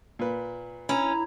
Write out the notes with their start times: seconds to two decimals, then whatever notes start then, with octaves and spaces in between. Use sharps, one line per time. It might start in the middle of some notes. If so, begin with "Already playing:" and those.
0.19 A#2 B4
0.89 C#4 E4 A#5